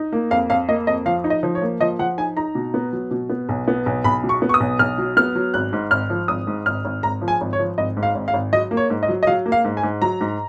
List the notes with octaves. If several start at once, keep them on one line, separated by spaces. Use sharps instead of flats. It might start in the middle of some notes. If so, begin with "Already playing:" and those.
Already playing: D#4
A#3
F2 F5
F2 F5
A#3 D#5
F2 D#5
F3 F5
D#4
D#5
F3
C#5
A#3
F3 D#5
F3 F#5
D#4 G#5
D#4 A#5
B2
B3
F#3
B2
B3
B1
B3
B1
B1 B5
B2
C#6
B3
C#6
D#6
B1
B1 F6
F#3
B3 F6
F#3
G#1 F#6
G#2
G#1 F6
F3
G#1 D#6
G#2
G#1 F6
G#1
G#1 A#5
F3
G#5
G#1
C#5
F3
G#1 D#5
G#2
F5
G#1
F5
G#1
F#3 D#5
A#3
C#5
G#2
D#5
F#3
D#5
F#3 F5
A#3
F5
G#2
G#5
G#2
F#3 A#5
G#2